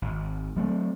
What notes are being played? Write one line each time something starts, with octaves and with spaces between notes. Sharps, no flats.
G#1
F#3 A3 C4